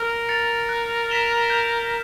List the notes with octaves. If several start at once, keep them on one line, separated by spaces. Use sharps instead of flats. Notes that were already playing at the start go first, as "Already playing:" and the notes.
Already playing: A#4 F6
A6 C#7 F7
F#6
B6 E7 G7
G6